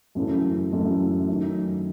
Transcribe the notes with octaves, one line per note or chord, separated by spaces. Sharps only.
F#2 C#3 E3 A3
F#2 C#3 E3 A3
F#2 D#3 A3